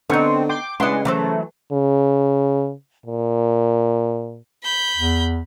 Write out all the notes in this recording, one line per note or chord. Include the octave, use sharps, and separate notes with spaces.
D3 B3 C4 D#4 F#5 C#6
G5 C6 D6
C#3 G#3 D4 E4 B4 F#5 C6
E3 F#3 A3 C5
C#3
A#2
B5 G6
E2